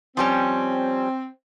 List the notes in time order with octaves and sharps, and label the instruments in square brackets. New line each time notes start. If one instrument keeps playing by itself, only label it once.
[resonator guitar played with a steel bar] F3 G3 C#4 [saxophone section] C4